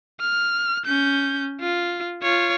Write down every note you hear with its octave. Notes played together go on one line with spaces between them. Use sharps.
F6
C#4 G6
F4
F4 C#5